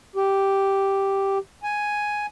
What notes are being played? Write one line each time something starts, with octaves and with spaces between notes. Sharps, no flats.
G4
G#5